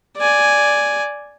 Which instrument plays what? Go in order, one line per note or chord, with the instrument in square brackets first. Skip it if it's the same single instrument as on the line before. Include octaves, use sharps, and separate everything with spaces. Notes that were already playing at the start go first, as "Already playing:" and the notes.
[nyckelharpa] D5 G#5